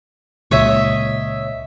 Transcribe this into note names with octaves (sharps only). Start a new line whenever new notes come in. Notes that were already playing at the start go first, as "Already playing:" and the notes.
C#2 A#2 C#5 D#5 E5